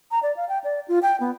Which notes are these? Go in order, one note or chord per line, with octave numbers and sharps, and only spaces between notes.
A#5
D5
F5
G5
D5
F4
G5
B3